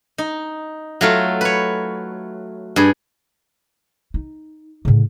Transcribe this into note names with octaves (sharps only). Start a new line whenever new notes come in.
D#4
F#3 A3 F4
B4 C#5
G2 G#4
D#4
A2 C#3